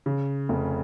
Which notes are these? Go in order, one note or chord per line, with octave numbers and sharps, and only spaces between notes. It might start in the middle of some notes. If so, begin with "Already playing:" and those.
C#3
F1